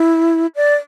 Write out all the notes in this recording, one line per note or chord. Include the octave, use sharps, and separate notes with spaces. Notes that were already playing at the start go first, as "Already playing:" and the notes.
Already playing: E4
D5